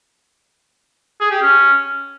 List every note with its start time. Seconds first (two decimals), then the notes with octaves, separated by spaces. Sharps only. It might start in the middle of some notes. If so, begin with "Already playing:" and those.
1.21 G#4
1.31 G4
1.42 C#4